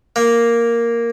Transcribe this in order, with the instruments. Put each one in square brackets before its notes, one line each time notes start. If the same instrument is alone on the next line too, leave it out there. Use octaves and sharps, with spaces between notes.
[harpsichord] A#3